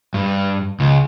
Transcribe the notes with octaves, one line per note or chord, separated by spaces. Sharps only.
G2
C#2